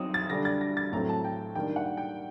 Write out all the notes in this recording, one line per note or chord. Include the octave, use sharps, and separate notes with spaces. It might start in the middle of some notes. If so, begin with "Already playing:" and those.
Already playing: F#3 C4 D#4 D#6
A6
D3 G3 D4 A#6
A6
A#6
A6
A2 F#3 A3 C4 A#5
A5
G5
D#3 G3 A#3 D4 G5
F#5
G5